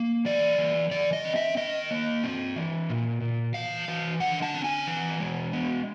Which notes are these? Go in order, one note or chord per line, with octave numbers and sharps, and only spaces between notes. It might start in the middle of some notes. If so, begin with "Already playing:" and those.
Already playing: A#3
E3 D5
E3
E3 D5
D#5
C4
E5
D#3 D#5
A#3
C4
E3
A#2
A#2
E3 F5
E3
D3 F#5
A5
C4
G#5
E3
G#3
B3